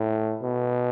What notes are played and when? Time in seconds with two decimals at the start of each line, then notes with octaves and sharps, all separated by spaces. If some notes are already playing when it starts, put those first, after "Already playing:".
Already playing: A2
0.43 B2